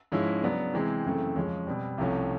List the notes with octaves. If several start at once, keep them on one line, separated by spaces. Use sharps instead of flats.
G#2 F3 G#3 C#4 E4
C#3 F#3 B3 D4
C3 E3 G#3 C4
F#2 C#3 E3 A3 C4
F2 C#3 F3 G#3 C#4
B2 G3 C4
C2 C3 F3 A3 C#4